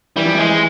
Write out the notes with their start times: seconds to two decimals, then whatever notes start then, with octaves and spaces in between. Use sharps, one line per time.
0.17 E3 G3
0.25 F3
0.35 E3 G#3